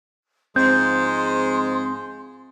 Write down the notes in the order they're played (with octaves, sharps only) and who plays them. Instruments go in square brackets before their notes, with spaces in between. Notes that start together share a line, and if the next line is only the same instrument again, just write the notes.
[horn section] G#2 F3 G#3 [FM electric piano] C4 [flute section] C6 [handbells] G6